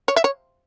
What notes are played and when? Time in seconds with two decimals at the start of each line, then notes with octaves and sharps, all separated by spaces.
0.08 C#5
0.16 E5
0.24 C#5